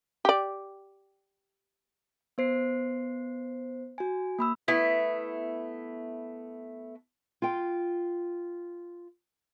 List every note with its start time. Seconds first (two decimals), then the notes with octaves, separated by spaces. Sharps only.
0.25 G4 D5
2.38 B3 C5 C7
3.98 F#4 G#5
4.39 A#3 B5 E6
4.68 A3 B3 E4
7.42 F4 G5